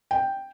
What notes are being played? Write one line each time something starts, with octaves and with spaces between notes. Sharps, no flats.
G5